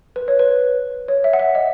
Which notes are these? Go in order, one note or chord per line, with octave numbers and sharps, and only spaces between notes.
B4
C#5
B4
C#5
E5
F#5
E5
D#5